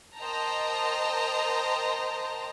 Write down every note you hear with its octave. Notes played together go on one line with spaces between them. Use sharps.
A#4 C5 D#5 G5 A5 A#5